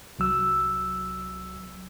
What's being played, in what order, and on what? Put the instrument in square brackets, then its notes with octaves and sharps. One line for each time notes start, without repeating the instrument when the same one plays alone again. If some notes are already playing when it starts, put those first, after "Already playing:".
[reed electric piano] C2 F#3 E6